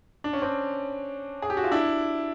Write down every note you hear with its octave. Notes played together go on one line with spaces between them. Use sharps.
D4
C#4
C4 D4
G#4
G4
F#4
F4
D4 E4